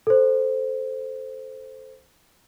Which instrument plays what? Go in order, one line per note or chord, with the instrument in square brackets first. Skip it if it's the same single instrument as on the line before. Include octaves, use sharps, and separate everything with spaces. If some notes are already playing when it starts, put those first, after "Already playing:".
[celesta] A4 C5